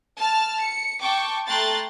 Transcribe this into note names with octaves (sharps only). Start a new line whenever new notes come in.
A5 F6
C#7
G5 A5 C#6 D6
A3 G5 A#5 C6 F#6 A6